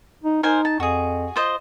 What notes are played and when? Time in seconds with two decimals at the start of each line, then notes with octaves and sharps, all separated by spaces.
0.24 D#4
0.43 D#4 A#4 C5 G#5
0.65 A5
0.80 F2 F#4 G#4
1.36 F4 C5 D#5